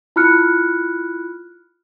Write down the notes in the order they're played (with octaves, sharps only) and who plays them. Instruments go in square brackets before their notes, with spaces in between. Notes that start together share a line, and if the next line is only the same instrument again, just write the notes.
[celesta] E4 F4 B5 F6 F#6 C#7